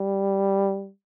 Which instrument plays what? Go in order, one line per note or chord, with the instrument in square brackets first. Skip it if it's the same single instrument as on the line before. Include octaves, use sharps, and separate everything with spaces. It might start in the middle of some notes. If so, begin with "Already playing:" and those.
Already playing: [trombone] G3